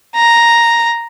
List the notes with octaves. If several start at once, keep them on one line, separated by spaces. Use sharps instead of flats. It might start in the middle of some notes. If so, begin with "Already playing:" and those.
A#5